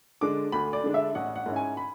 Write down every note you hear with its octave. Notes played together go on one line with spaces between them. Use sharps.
D3 G#3 D4 D6
D2 B5
D5
D3 G#3 D4
E5
A1 F#5
F#5
G#2 G#3 C#4 E4
G#5
B5